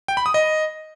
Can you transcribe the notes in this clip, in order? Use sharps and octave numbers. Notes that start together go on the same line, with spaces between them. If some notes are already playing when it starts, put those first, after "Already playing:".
G5
B5
D#6
D#5